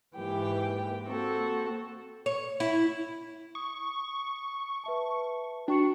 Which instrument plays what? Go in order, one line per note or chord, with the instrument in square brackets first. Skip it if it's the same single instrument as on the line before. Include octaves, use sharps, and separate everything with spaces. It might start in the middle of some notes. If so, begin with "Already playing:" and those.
[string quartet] G#2 E3 A#3 G4 G5
A#3 C4 F#4 A4
[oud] C#5
E4
[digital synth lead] C#6 [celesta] D#6
[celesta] B4 E5 A5
[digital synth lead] D4 [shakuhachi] F#4 [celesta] G5 C#6 C#7